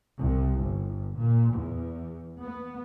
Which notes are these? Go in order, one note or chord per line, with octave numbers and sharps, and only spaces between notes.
C2
G1
A#2
E2
B3